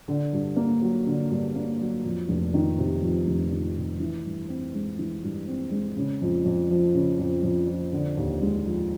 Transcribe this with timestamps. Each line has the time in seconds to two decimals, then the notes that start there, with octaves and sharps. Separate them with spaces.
0.08 D3
0.33 G2
0.56 A#3
0.82 F#3
1.06 D3
1.30 G2
1.55 A#3
1.80 F#3
2.05 F2
2.29 F1
2.54 D#3
2.78 C3
3.02 F2
3.27 F1
3.51 D#3
3.76 C3
4.00 E3
4.25 G2
4.49 C4
4.74 G#3
4.99 E3
5.23 G2
5.47 C4
5.71 G#3
5.97 C#3
6.21 F2
6.45 F2
6.70 F3
6.95 C#3
7.19 F2
7.43 F2
7.68 F3
7.93 D3
8.17 D#2
8.42 G#3
8.66 F3